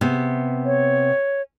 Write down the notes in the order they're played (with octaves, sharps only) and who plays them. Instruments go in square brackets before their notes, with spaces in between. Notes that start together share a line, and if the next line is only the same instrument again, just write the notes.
[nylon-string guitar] C3 B3
[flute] C#5